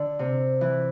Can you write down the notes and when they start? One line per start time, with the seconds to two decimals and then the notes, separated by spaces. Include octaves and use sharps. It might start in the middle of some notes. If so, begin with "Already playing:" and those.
Already playing: D3
0.19 C3
0.61 E3